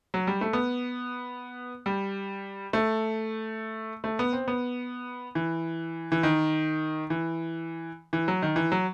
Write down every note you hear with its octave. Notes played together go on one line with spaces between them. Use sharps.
F#3
G3
A3
B3
G3
A3
A3
B3
C4
B3
E3
E3
D#3
E3
E3
F#3
D#3
E3
F#3